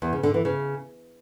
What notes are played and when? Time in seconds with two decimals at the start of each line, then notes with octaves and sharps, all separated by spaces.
0.02 E2
0.13 C#3
0.23 D3
0.34 E3
0.45 C#3